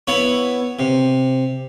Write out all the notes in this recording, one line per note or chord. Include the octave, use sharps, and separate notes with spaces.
B3 E4 C#5
C3